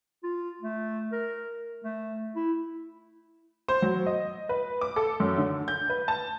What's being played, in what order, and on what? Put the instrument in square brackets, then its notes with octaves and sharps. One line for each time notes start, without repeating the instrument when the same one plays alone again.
[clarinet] F4
A3
A#4
A3
E4
[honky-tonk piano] C5
F#3
D#5
B4
D6
A4
F#2
D3
G6
B4
A5